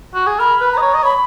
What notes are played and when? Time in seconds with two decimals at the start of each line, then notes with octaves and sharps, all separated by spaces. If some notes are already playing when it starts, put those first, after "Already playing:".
0.15 F#4
0.27 G#4
0.39 A#4 B5
0.61 B4
0.72 A#5
0.78 D#5
0.82 C#5
0.94 D#5
1.03 C#5 B5